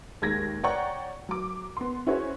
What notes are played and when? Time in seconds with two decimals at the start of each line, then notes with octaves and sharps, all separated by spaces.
0.22 D#2 G#3 G#6 A#6
0.63 C#5 D5 F#5 G5 A#5 C#6
1.29 F#3 D6
1.77 B3 C6
2.06 C#4 E4 F#4 G#4 C5 C#5